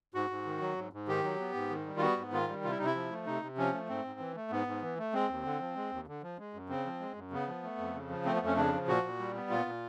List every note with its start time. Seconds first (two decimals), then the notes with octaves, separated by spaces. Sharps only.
0.14 G#2 F#4
0.30 G#2
0.46 D#3
0.61 F#3
0.77 G#2
0.93 G#2
1.08 D#3 G4
1.24 F#3
1.40 B3
1.54 G#2
1.70 D#3
1.86 G3
1.97 F4
2.01 B3 F#4
2.17 G#2
2.33 D#3 F4
2.48 G3
2.64 C3 F4
2.71 E4
2.79 C3 D#4
2.85 E4
2.95 F3
3.11 A3
3.26 C3 D#4
3.42 C3
3.57 F3 C#4
3.73 A3
3.89 G#2 C4
4.04 G#2
4.20 E3
4.35 A3
4.51 G#2 B3
4.67 G#2
4.82 E3
4.98 A3
5.14 G#3 C4
5.29 D#2
5.44 D3
5.60 F3
5.76 G#3
5.91 D#2
6.07 D3
6.23 F3
6.39 G#3
6.54 F#2
6.69 C#3 C4
6.85 F3
7.00 G#3
7.16 F#2
7.31 C#3 B3
7.47 F3
7.63 A3
7.78 F2
7.94 C#3
8.10 F3
8.25 A3 C4
8.36 B3
8.41 F2
8.46 C#4
8.57 C#3 D4
8.73 F3
8.88 A#2 F#4
9.03 A#2
9.19 G3
9.35 B3
9.50 A#2 F4
9.66 A#2